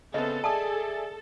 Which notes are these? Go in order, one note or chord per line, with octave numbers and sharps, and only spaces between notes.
C#3 B3 C4 A4 D#5 E5
G#4 D5 E5 G#5 A5 D#6